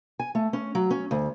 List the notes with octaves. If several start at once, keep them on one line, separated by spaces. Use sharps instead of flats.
G#5
A3
C#4
F#3
C#4
D2